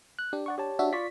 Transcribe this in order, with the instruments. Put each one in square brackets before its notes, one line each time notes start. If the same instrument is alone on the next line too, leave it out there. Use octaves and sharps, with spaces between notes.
[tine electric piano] F#6
[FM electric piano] D4 [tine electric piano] G4
[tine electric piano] D5 F#5 C#6
G4 C#5 A5
[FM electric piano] D4 F#4 E5
[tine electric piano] F4 D5 C#6 [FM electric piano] B6